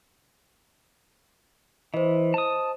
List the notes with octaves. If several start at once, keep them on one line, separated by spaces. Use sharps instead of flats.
E3 C5 D#5
A5 D#6